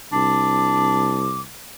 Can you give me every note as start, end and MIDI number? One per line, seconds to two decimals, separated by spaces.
0.12 1.48 36
0.12 1.31 62
0.12 1.41 86